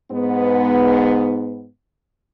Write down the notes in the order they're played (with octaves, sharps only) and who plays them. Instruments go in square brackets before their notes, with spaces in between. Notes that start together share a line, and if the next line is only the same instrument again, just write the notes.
[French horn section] G#2 B3